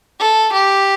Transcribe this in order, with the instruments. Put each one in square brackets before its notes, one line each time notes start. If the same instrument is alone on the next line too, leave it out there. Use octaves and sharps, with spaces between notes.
[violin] A4
G4